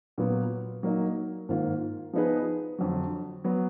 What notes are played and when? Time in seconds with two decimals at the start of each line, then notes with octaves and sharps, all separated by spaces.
0.18 A#2 F#3 B3
0.83 F#3 A#3 D#4
1.49 G#2 D#3 A#3 F4
2.13 F3 B3 D#4 G#4 B4
2.78 F2 D3 F#3
3.44 F#3 B3